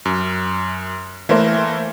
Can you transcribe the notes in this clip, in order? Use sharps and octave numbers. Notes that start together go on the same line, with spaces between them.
F#2
E3 A3 A#3 A#4 C5